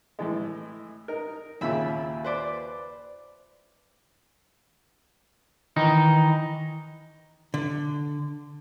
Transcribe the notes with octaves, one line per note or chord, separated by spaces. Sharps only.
A2 E3 G#3
D#4 A#4
D#2 A#2 C#3 E5 B5 E6
B4 C5 D5
D#3 E3 D#4
D3